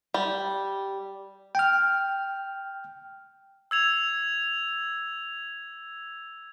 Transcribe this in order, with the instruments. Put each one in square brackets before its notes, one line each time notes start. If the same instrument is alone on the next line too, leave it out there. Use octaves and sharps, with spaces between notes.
[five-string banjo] G3
[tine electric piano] G5 F6
[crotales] E6 G#6 F7